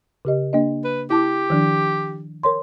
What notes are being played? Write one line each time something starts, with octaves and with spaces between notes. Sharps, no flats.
C#3 G4 D#5
A#3 D4 D#5
B4
E4 G4 A5 D6
D#3 F3 D4
A#4 C#5 C6